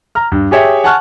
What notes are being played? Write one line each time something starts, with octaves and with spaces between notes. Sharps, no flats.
A#5 F6
G2
G4 G#4 C#5 E5 G5
F#5 G#5 A5 C#6 F6 F#6